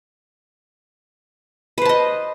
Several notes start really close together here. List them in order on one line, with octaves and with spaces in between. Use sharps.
B4 C5 A5 D#5